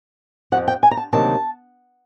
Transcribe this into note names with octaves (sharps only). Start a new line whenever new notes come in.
F2 C#3 F3 F#5
G5
G#5
A#5
A5
D2 C3 D#3 F#3 A#3 A5